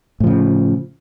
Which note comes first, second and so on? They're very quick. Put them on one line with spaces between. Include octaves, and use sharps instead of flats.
A2 F3 C#3